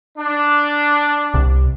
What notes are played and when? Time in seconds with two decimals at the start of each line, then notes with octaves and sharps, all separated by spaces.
0.18 D4
1.34 C2